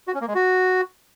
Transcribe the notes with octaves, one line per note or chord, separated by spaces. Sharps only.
F#4
C#4
A#3
G#3
F#4